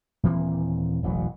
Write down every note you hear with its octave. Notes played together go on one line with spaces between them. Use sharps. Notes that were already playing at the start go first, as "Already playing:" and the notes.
D#1 E3 A#3 C4
E1 A1 E3 F#3